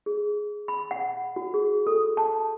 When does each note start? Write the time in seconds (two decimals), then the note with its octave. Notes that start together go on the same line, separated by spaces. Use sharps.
0.06 G#4
0.68 B5
0.91 F#5
1.36 F#4
1.54 G#4
1.87 A4
2.17 A5